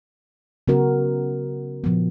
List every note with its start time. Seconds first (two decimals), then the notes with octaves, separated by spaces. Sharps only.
0.68 C#3 F#3 B3 F#4 A#4
1.84 A#2 F3 B3